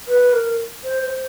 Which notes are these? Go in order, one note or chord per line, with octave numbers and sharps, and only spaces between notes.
B4
A#4
C5
C5